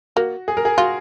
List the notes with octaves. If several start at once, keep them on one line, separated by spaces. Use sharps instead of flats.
A#3 F#4
G#4
A#4
G#4
F4 F#4